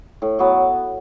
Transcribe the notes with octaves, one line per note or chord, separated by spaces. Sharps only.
A2
F#3 B3